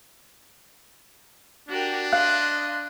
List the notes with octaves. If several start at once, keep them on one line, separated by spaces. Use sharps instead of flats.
D4 F#4 G4 A#4
D#5 F5 C6 F#6